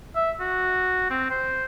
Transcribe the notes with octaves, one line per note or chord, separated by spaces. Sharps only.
E5
F#4
C4
C5